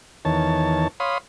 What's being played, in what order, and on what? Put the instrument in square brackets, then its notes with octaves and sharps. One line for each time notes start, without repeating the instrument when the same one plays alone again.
[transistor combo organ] E2 D#3 C#5 A5
C#5 F5 B5 C6 D#6